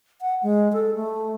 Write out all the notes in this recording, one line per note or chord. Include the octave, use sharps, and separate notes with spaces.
F#5
G#3
A4
A3